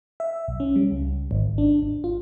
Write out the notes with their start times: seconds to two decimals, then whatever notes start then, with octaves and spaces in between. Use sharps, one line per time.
0.20 E5
0.48 B1
0.60 C#4
0.76 G3
0.91 C#2
1.31 G#1
1.58 D4
1.83 G#1
2.04 F4